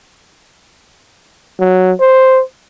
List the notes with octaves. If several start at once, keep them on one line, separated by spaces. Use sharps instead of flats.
F#3
C5